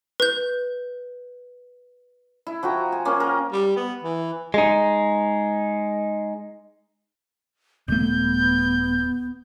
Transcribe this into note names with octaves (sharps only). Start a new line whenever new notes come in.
B4 G6
E4
F3 F#4 G5 A#5
G#5
A#3 C#4
A#4
G3
B3
E3
G#3 D#4
D#1 A3 B3 G6